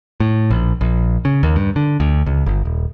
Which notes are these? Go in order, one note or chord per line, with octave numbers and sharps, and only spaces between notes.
A2
A#1
A#1
C#3
D#2
G2
D3
D2
C#2
G1
D#1